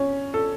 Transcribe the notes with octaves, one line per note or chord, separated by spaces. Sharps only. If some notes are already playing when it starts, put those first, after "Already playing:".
Already playing: C#4
A4